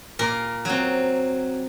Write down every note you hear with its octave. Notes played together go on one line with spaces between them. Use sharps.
A#2 A#4
F#3 C4